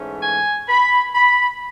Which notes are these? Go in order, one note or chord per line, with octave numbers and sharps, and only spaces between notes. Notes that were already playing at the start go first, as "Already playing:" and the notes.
Already playing: G#2 E3 A3 C#4
G#5
B5
B5